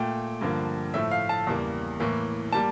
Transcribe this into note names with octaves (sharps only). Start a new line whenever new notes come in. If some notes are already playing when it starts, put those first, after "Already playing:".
Already playing: A#2 A3 G5
G2 D3 F3 A#3
A2 F3 A3 E5
F5
A5
E2 C#3 G3 A#3
A2 E3 A#3
G3 A#3 A5